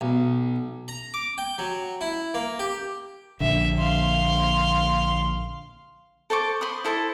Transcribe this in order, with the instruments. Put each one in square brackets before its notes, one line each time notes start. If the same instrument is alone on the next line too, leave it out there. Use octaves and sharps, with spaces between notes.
[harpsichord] B1
A#5
D6
G5
F#3
E4
A#3
G4
[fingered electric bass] A#1 D3 [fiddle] E5
[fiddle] F5 C6
[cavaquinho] A4 C5 C#6 D6
C5 B5 D#6
E4 A4 C5 A5